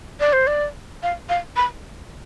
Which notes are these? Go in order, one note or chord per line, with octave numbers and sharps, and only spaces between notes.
D5
C5
D5
F5
F5
B5